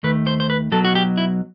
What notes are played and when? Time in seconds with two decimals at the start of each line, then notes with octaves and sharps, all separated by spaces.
0.03 D#2 D#3 A3 B4
0.27 C5
0.40 C5
0.50 B4
0.71 B1 B2 F#3 A4
0.85 F#4
0.95 G4
1.18 E4